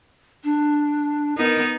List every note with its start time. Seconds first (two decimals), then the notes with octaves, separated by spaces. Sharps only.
0.44 D4
1.38 B3 D#4 A#4